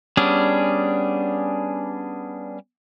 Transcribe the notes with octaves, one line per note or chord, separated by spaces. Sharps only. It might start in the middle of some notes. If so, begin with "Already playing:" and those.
G3 B3 C#4 D4 G#4